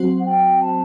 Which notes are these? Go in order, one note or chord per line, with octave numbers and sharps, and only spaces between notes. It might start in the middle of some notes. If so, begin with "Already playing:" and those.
Already playing: F#3 C4 F#4 C5
F#5
G5
A5